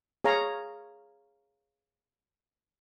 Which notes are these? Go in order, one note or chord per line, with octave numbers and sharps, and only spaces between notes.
G#4 C#5 F5 A#5